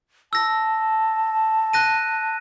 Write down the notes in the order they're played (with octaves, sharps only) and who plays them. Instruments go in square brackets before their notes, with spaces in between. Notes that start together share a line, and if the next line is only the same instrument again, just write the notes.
[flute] A5 [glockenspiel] E6 A#6
[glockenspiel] F#6 A#6 D#7